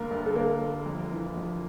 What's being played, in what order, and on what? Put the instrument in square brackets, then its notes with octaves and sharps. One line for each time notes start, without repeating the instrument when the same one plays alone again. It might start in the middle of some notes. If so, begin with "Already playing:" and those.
Already playing: [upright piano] G1 A#3 A#4
G1
A4
G1 A#3 A#4
G1
F2
E3
F2